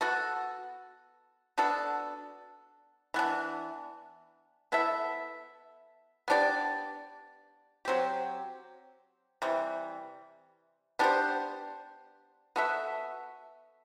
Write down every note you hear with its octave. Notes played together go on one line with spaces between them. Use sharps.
B3 F#4 A4
B3 D4 F#4 A4
E3 B3 D4
B3 E4 A4 E5
B3 D4 G4 D5
F#3 C4 G4
C3 E3 G3
B3 D4 G4 C5
B3 F#4 A4 E5